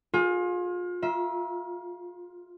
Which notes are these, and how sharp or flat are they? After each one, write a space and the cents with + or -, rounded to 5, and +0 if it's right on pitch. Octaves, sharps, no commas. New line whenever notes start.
F4 +30 G#4 +0
F4 +0 E5 -10 A#5 +40